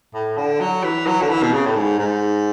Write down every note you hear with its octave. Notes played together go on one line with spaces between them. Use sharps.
A2
D3
F#3
E3
F#3
D3
E3
B2
C#3
A2
G#2
G#2